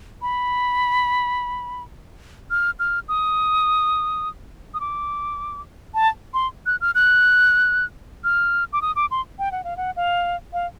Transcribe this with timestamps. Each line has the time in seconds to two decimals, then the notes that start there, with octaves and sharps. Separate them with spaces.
0.22 B5
2.51 F6
2.79 F6
3.08 D#6
4.74 D#6
4.80 D6
5.94 A5
6.34 C6
6.66 F#6
6.81 F6
6.95 F#6
8.24 F6
8.73 D6
8.82 D#6
8.96 D6
9.11 C6
9.39 G5
9.52 F#5
9.64 F5
9.77 F#5
9.96 F5
10.53 F5